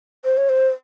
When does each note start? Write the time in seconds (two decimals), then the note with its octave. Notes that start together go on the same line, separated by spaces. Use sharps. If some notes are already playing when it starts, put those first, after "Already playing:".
0.25 C5
0.37 C#5
0.49 C5